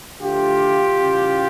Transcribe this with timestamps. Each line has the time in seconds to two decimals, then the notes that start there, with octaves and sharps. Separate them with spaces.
0.21 D3 F3 A3 F4 G4
0.94 C#3 E3 G3